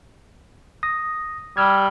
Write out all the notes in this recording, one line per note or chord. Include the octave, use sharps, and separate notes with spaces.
D#6 A#6
G3 E6 F6 G#6